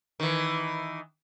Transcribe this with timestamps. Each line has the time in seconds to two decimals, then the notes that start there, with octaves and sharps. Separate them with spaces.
0.20 D#3 E3